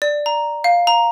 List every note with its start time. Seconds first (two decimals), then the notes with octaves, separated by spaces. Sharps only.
0.02 D5
0.26 A#5
0.64 F5
0.87 A#5